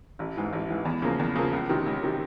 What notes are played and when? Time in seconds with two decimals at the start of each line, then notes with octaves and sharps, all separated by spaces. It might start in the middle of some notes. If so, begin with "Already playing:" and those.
0.19 A1
0.36 G#2 E3
0.53 A1
0.69 G#2 E3
0.85 E2
1.02 C#3 F3 A#3
1.19 E2
1.36 C#3 F3 A#3
1.53 C#2
1.69 C3 D#3
1.86 C#2
2.03 C3 D#3